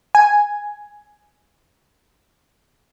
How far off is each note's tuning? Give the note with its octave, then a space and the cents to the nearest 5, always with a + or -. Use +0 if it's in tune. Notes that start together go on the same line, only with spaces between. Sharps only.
G#5 +0